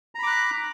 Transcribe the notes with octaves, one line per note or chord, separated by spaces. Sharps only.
A#5 B5 D6 F#6